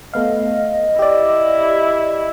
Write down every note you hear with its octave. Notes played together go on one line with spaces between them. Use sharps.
A3 B3 D#5 F5
E4 G4 D5